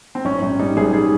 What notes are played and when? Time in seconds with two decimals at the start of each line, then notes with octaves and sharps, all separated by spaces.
0.15 C4
0.25 G#1 C#4
0.42 G#1
0.59 G3 D#4
0.77 G#1 G#4
0.93 G3 G#4